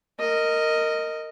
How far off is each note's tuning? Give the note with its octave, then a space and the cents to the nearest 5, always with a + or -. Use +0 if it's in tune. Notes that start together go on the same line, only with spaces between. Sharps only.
A#4 -15 D#5 +0